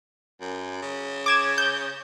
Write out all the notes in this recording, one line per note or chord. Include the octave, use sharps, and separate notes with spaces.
F#2
C#3
D6 G#6 E7
G6